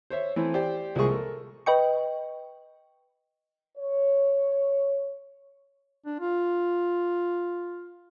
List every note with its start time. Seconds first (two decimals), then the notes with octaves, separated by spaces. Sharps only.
0.10 C5 C#5 E5
0.36 E3 A3 C4 E4
0.54 G4 C5 D5 G5
0.95 C2 F3 G#3 A#3 G#4 C#6
1.09 A4 A#4
1.66 B4 D#5 G5 C#6
3.78 C#5
6.06 D4
6.20 F4